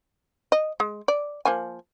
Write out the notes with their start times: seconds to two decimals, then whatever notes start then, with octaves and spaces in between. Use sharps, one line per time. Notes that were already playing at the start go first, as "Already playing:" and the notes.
0.52 D#5
0.80 G#3
1.08 D5
1.45 F3 A#3 G#5